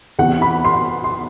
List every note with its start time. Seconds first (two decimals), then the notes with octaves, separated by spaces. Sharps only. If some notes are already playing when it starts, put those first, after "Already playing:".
0.19 E2 C3 E3 F#5
0.42 B5
0.65 C6
1.04 C6